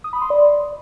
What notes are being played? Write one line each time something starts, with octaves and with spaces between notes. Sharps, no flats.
D#6
B5
C6
D5